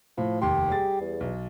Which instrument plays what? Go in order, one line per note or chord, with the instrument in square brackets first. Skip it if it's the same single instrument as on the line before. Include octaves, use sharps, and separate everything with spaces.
[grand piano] A2 [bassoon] F3
[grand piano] F1 D#2 C6 [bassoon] G4
[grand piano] G3 G#4 A6
[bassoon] E2
[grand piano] B1